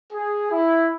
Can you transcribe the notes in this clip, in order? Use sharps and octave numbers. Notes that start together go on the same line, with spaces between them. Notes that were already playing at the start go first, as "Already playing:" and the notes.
G#4
E4